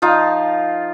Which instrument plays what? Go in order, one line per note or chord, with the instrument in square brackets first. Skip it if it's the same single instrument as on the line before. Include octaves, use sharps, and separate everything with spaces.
[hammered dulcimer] F3 D#4 F4